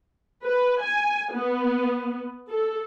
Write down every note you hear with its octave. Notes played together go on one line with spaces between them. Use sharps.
B4
G#5
B3
A4